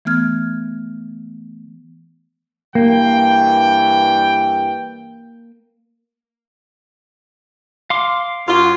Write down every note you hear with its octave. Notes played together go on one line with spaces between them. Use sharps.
E3 A3 B3 F6 G#6
G2 E3 A#3 G5
F5 C6 D6
F#2 F4